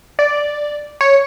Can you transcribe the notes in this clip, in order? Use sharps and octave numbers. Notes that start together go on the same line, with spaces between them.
D5
C#5